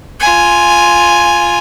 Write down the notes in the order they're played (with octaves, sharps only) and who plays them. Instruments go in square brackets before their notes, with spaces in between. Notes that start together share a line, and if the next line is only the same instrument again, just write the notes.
[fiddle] F4 G#5